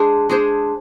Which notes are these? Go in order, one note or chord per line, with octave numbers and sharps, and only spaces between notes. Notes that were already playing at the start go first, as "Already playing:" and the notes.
Already playing: G#3 D4 G#4 C5
G#3 D4 G#4 C5